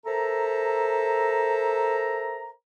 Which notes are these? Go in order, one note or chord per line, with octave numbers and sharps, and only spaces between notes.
A4 A#4 C5 E5 A#5